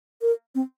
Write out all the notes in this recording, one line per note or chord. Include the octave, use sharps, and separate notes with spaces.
A#4
C4